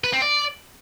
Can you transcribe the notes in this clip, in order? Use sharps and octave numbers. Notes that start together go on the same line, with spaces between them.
B4
C4
D5